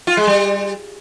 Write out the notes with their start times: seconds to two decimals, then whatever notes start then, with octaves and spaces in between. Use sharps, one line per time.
0.07 F4
0.17 G#3
0.27 G3